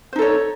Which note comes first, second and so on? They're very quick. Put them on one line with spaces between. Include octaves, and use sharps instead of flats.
C5 D#4 A4 C#5